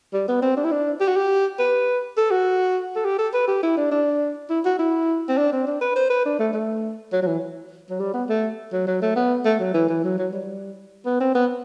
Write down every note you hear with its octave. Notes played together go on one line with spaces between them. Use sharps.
G3
B3
C4
D4
E4
D4
G4
F#4
G4
B4
A4
F#4
A4
G4
A4
B4
G4
E4
D4
D4
E4
F#4
E4
C4
D4
C4
D4
B4
C5
B4
D4
A3
A3
F#3
F#3
E3
F#3
G3
B3
A3
F#3
F#3
A3
B3
A3
F#3
E3
E3
F#3
F#3
G3
B3
C4
B3